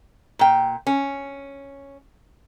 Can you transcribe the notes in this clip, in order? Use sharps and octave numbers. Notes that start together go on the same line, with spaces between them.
A#2 G5
C#4